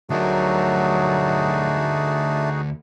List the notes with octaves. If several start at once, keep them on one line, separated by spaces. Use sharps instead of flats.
D2 F#3 A3 D4 D#4 F#4 G#4 A#4